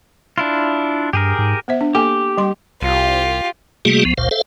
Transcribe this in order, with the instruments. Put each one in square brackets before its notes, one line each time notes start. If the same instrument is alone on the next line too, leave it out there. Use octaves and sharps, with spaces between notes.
[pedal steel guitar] D4 E4 F4
[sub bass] G2 [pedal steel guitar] G4 G#4 A#4
[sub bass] G#2
[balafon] B3 C5 E5
D4
[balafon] A#3 A4 G#5 [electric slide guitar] G4
[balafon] G3 C6
[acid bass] C2 [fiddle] F4 G4
[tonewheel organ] C3 G3 A3 A#3 F#4 G#4
C#2 F3 B3
F#1 C#2 A#2 C5 F5
A4 C5 E5 F5